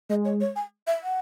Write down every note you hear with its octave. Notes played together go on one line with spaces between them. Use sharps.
G#3 D#5
C#5
C#5
G#5
E5
F#5